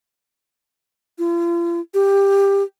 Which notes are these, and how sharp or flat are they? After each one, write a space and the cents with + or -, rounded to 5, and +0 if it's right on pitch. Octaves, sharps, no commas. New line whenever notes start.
F4 -40
G4 +15